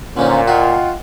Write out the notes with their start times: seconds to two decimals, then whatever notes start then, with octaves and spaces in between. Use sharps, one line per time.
0.17 A#2 D3 F3 C#4 D#4
0.47 F4 F#4 D#5 F#5 G5